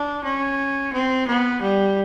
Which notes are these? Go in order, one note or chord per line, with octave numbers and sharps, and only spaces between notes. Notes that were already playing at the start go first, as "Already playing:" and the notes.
Already playing: D4
C#4
C4
B3
G3